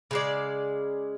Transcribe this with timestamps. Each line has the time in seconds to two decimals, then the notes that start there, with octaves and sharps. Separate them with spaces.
0.11 C#3 G#3 D5